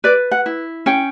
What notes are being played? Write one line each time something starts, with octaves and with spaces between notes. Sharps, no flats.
B4 D5
F#5
E4
C#4 G5